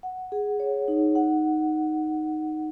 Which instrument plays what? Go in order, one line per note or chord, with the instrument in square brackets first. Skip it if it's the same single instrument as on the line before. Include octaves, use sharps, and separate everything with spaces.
[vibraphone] F#5
G#4
C#5
D#4
F#5